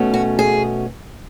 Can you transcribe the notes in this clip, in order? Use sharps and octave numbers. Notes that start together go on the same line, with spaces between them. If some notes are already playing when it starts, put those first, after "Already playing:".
Already playing: B2 A3 C#4
F#4
G#4